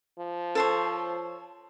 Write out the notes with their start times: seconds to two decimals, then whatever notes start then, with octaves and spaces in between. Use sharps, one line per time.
0.19 F3
0.55 A4 C5 C#5